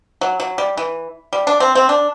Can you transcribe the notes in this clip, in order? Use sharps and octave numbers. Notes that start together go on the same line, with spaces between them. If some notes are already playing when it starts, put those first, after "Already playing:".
F#3
F#3
G3
E3
G3
D4
C4
C4
D4